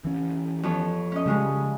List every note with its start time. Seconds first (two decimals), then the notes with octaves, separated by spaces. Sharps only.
0.05 E3 C#4
0.63 F2 B3 C#5
1.12 C#4 D#5
1.26 C#3 G3 G#3 C#4